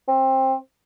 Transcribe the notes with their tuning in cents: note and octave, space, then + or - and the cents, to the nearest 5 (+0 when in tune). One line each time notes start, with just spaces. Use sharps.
C4 +20